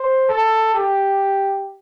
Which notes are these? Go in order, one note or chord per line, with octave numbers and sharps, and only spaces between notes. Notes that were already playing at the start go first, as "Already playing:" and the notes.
Already playing: C5
A4
G4